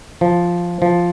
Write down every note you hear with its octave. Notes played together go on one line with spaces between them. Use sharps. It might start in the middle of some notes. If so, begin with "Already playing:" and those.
F3
F3